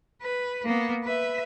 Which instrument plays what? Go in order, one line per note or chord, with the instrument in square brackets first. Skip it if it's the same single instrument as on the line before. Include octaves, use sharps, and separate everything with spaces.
[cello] B4
A#3 B3
B4 E5